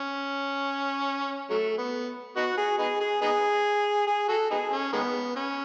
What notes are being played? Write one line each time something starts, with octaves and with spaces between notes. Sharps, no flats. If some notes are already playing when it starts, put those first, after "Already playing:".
Already playing: C#4
F#3 A3
B3
B3 D#4 F#4
G#4
B3 D#4 G#4
G#4
B3 D#4 G#4
G#4
F#4 A4
B3 D#4 G#4
C#4
D#3 G#3 B3
C#4